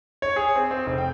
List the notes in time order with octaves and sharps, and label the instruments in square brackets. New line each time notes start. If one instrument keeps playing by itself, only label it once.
[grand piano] C#5
G#4
C4
C4
F1
G5